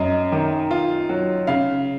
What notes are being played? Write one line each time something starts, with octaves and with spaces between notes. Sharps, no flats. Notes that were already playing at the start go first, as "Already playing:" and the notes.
Already playing: F#2 D#5
D#3
F4
F#3
C#3 F5